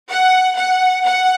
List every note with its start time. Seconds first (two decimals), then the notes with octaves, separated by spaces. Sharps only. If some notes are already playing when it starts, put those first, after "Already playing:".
0.11 F#5
0.57 F#5
1.05 F#5